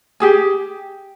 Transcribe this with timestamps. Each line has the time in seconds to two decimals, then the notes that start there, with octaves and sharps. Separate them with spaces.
0.20 G4 G#4 G#5